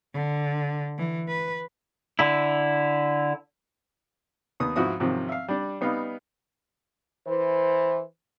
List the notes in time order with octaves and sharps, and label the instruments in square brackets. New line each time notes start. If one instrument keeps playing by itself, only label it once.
[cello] D3
E3
B4
[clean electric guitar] D3 E4
[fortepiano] D#2 B3 D#6
G#2 F3 E4 F#4 B4 D#6
G#2 C3 D#3 F3 F#3
E5 F5
G3 D4
G3 B3 D#4 F5
[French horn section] E3 C5